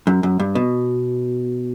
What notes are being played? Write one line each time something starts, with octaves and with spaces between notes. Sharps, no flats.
F#2
F#2
G2
B2